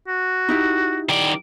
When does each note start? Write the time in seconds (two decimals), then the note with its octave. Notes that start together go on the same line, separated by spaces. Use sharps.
0.08 F#4
0.49 D#4 E4 G4
1.09 D#3 D5